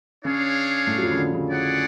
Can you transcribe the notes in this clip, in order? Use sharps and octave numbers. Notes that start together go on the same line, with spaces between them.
C#3 C#4 D4 G#4 C#5 F5
A2 A3
F#3
F2 F3
C#3
D3
C#3
C#4 G#4 D5 F#5